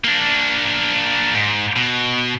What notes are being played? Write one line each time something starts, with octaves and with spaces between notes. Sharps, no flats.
A#3 D4
G#2
B2